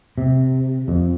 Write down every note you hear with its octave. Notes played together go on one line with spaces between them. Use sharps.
C3
F2